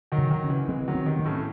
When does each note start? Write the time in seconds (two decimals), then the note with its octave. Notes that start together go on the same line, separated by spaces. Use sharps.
0.12 D#3 F#3
0.18 C#3
0.31 D#3 F#3
0.44 C#4
0.50 C#3 E3
0.69 E3 G#3 C4
0.88 D#3 F#3
0.95 C4
1.06 C3 D#3
1.19 C4
1.25 A2 C#3